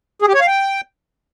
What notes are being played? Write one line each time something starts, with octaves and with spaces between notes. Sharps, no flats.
G#4
G4
C#5
F5
G5